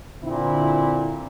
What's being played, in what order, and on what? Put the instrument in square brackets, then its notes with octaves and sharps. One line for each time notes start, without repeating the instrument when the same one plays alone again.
[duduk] A#2 [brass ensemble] D3 C4 E4